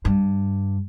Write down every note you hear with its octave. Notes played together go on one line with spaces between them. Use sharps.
G2